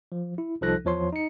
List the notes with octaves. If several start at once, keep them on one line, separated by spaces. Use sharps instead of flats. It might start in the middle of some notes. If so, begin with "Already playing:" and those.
F3
E4
C2 F3 D#4 A4 F#6 A#6
E2 F3 C#5 C6
D#4 C#7